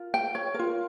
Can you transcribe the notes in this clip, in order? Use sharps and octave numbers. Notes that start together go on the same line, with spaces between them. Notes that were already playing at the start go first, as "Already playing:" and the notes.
Already playing: F4 A#4
G5
C#5
F4 A#4